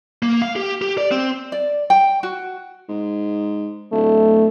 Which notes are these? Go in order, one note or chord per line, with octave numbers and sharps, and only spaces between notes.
A#3
F5
G4
G4
D5
C4
D5
G5
F#4
G#2
D1 A3